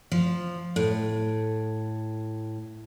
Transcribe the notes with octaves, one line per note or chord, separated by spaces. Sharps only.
F3
A2